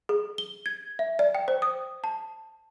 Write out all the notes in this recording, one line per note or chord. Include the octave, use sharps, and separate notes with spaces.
G#4
G7
G#6
E5
D5
G5
C5
D#6
A5